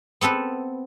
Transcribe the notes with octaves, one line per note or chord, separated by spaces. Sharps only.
B3 C4 A4 B4